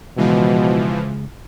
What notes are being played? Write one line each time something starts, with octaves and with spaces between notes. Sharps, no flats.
C#2 B2 E3 F3 G#3